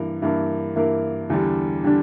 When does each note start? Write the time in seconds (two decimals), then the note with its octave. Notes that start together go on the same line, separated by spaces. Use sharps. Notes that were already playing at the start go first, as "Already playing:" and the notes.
Already playing: G2 E3 A#3 E4 A#4
0.22 G2 E3 A#3 E4 A#4
0.76 G2 E3 A#3 E4 A#4
1.30 E2 D3 G3 D4
1.84 D3 G3 D4